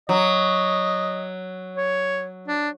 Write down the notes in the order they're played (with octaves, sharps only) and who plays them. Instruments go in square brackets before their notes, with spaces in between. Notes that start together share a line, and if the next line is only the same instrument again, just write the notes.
[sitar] F#3 [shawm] D#5
[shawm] C#5
D4